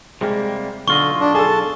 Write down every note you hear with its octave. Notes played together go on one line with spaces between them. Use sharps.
C3 G3 G#3 A#3
B1 D3 F4 D#5 C#6 G7
D4
G#4 A4 A5